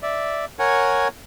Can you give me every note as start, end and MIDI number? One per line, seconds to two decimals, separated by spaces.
0.03 0.45 74
0.03 0.45 76
0.59 1.08 70
0.59 1.08 73
0.59 1.08 78
0.59 1.08 80